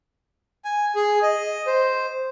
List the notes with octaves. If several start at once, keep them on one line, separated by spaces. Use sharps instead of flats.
G#5
G#4
D#5
C5